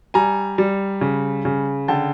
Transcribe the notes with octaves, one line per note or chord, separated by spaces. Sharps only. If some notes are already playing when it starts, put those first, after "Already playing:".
G3 G#5 A#5
G3
C#3
C#3
D3 G5 A5